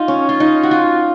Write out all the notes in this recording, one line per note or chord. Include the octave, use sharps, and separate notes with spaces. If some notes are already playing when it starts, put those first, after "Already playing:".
Already playing: D#4 F4
C#4
F4
D#4
F#4
F4